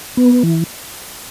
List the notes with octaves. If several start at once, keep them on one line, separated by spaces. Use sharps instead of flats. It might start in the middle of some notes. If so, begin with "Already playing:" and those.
B3
E3